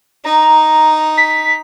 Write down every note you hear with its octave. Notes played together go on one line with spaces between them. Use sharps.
D#4 A#5
B6